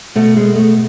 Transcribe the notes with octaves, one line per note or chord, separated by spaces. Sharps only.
B2 A3
G#3
A3